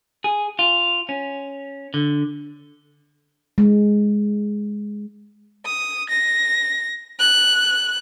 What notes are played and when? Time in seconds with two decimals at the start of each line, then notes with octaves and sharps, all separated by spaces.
0.24 G#4
0.59 F4
1.09 C#4
1.94 D3
3.58 G#3
5.65 D#6
6.09 A#6
7.20 F#6